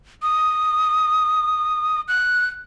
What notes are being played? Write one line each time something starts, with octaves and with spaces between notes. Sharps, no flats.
D#6
F#6